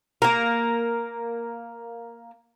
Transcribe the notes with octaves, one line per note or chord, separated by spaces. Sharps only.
A#3 A#4